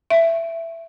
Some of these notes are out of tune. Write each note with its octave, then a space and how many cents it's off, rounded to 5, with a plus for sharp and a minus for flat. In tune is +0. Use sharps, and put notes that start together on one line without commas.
E5 +10